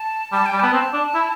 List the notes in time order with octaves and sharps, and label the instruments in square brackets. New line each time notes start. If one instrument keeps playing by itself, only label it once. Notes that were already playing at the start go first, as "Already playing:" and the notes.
Already playing: [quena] A5
[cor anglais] G3 [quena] A5
[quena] G5
[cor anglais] G3
[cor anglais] B3 [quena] A5
[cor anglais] C4
D4
E4